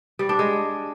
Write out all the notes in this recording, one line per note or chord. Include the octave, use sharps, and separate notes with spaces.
G3
D4
G#3